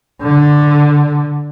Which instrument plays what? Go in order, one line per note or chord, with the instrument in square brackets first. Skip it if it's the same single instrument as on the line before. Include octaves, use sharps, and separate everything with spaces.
[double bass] D3